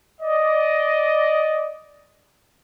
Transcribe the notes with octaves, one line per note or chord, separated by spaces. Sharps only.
D5 D#5